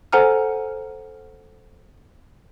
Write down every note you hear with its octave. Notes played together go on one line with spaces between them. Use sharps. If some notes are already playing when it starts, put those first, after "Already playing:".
A4 C5 F#5 G#5 A#5 F6